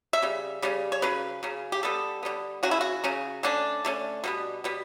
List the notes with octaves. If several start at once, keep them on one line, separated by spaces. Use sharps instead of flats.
E5
C#3 G3
C#3 G3 C#4
C#5
C#3 F#3 C#4 B4
C#3 F#3 C#4
G4
D3 G3 B3 A4
D3 G3 B3
C#3 F#3 C#4 F#4
E4
F#4
C#3 F#3 C#4
D3 A3 C#4 D4
D3 A3 C#4
B2 G3 B3
B2 G3 B3